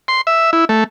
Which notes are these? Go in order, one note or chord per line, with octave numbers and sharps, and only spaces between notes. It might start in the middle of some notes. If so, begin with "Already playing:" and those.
C6
E5
E4
A3